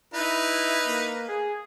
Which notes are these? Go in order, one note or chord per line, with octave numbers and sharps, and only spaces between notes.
D#4 E4 B4
A#3
G#4